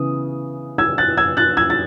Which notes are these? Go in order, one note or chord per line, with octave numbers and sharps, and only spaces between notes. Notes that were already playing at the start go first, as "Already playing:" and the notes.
Already playing: C#3 E3 B3 D#6
E6 G#6
F#6 A6
E6 G#6
F#6 A6
E6 G#6
A6